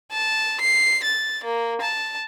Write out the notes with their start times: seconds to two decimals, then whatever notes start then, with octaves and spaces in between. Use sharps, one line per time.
0.12 A5
0.61 C7
1.04 A6
1.44 A#3
1.82 A5